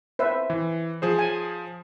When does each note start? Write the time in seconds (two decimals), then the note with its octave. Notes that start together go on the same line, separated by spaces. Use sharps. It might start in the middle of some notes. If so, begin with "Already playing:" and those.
0.19 B4 C5 E5
0.50 E3
1.02 F3 G#4 C5
1.19 G#5